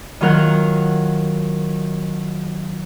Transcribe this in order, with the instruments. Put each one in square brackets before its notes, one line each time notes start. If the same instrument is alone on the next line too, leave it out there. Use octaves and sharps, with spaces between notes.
[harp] D#3 F#3 F4 A#4 F#6